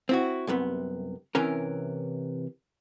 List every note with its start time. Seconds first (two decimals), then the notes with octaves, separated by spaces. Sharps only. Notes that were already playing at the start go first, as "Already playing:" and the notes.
0.09 C4 E4 F#4
0.47 C2 F#2 C3 B3
1.35 C3 E3 C#4 A#4